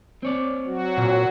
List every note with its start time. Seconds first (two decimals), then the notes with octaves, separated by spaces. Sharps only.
0.23 C4 C#5 D5
0.66 F#3 F#4
0.98 A#2